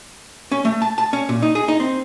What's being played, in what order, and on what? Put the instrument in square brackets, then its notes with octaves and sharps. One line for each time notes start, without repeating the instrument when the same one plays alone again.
[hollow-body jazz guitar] C#4
A3
A5
A5
C#4
A#2
D#4
G#4
D#4
C4